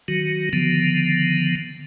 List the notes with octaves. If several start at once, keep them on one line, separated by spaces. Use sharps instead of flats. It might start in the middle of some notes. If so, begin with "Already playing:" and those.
D#3 F#3 F#4
D3 D#3 F3 B3